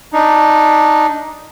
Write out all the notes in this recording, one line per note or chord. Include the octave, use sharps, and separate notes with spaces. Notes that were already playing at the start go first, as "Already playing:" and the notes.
D4 D#4